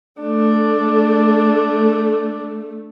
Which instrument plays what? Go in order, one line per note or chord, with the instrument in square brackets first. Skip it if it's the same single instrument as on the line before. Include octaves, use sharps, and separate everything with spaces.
[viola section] A3 [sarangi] D4